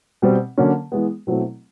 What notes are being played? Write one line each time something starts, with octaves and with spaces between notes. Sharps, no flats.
B2 G3 C4
D3 F#3 A#3 C#4
E3 G#3 B3
B2 F#3 A3 C4 E4